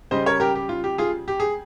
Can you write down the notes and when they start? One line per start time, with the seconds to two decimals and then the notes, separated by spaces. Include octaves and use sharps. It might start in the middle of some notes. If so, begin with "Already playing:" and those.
0.11 C#3 G3 C5 D#5
0.26 A#4 C#5
0.40 G4 A#4
0.55 G4
0.69 F4
0.84 G4
0.98 F4 G#4
1.28 G4
1.40 G#4